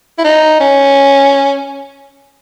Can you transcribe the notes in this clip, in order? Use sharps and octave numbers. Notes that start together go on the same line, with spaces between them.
E4
D#4
C#4